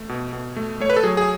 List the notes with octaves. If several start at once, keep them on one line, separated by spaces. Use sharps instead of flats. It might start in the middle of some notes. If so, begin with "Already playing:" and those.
Already playing: A3
B2
B2
A3
A3 C#5
B4
A4
F#3 G#4
G#4